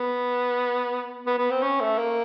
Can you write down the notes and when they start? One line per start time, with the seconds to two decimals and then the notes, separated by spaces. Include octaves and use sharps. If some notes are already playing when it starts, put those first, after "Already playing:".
Already playing: B3
1.26 B3
1.38 B3
1.51 C4
1.62 C#4
1.81 A3
1.98 A#3